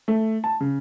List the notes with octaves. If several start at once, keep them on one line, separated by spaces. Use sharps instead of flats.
A3
A5
C#3